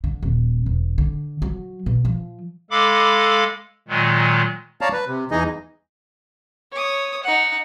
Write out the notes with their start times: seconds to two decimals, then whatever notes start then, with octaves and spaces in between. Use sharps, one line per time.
0.04 D3
0.23 D#1
0.66 E1
0.98 D3
1.42 F#3
1.86 B2
2.05 F3
2.71 G#3 A4 F5 B5 D6
3.88 A#2 D#3 F#3 G#3
4.81 C#5 D5 F5 A5 A#5
4.93 B4
5.07 C3
5.31 E2 E3 D#4 G#4 D#5
6.71 C#5 D#6
7.23 D#4 F#5